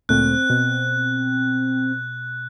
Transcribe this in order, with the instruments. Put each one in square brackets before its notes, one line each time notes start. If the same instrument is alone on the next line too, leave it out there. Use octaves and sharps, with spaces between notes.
[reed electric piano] D2 A#2 A3 [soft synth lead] C4 [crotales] F#6
[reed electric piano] B2